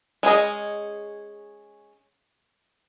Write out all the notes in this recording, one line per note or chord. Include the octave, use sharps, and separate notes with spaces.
G#3 C#4 G#4 D#5